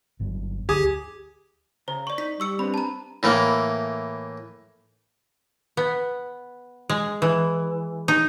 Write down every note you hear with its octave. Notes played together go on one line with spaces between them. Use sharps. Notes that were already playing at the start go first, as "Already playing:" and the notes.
G1 G2 F#3
D2 G4 G#4
C#3 C5 A#5
D5 C#6
D#4 B6
G3 C#6 E6 C#7
C4 D4 B4 B5
A5 A#5
A2 E3 A#3
B3
G#3
E3
D#4